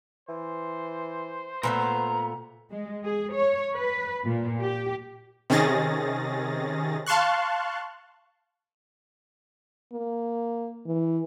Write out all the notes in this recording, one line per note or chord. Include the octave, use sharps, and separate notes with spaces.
E3 C5
A#2 A3 B3 B4 A#5
G#3
G#4
C#5
B4
A#2
G4
C3 D#3 C#4 G#4 A6 A#6
F5 A5 C6 C#6 F#6
A#3
E3